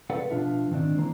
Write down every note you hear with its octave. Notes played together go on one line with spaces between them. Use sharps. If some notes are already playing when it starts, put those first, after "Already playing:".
G#4 A4 B4 D5 F#5
B2 F3 D4 F4 E5
G#2 D#3 C4 D4
D3 E3 A#3 C5